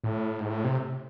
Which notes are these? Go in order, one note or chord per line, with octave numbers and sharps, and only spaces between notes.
A2
G#2
A2
C3